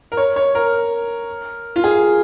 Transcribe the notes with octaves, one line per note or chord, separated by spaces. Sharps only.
A#4
C#5
C#5
A#4
F4
G#4